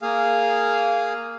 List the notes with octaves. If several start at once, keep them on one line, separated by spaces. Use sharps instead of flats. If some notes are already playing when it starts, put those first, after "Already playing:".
A#3 G#4 F5